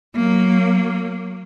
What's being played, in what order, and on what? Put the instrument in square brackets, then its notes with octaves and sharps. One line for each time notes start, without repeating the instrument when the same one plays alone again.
[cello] F#3 A#3